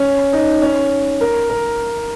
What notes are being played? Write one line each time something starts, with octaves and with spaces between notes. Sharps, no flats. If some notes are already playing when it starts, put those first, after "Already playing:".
Already playing: C#4
D#4
C#4
A#4
A#4